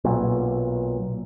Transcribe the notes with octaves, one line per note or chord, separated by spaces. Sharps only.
B1 A#2